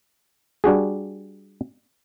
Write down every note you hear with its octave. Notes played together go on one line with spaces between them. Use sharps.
G3 D4 F#4 G#4